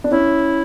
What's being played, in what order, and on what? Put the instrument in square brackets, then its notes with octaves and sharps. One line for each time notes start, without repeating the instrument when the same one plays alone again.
[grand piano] D4
[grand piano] C#4 [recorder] E4